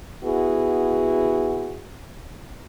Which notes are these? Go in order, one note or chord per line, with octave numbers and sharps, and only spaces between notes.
B3 E4 F#4 G#4